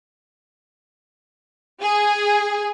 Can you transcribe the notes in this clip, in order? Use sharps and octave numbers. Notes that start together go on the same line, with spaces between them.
G#4